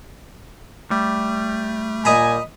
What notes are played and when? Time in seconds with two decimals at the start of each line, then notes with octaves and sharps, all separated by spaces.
0.91 G3 A3
2.05 A#2 D#5 G#5 A#5 B5